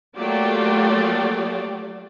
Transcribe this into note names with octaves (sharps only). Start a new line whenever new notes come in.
F#3 A3 A#3 F4 G4 D5